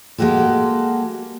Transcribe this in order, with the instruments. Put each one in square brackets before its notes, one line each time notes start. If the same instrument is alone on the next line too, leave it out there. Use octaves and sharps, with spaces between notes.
[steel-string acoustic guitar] G#3 A#3 F#4 G4 A4